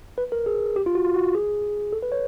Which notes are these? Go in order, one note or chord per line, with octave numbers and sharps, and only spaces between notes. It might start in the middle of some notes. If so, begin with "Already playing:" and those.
B4
A#4
G#4
G4
F4
F#4
F4
F#4
G#4
A4
B4
C#5